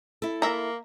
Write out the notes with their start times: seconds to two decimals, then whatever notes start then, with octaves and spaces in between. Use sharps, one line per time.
0.22 E4 A4
0.42 A#3 E5 A#5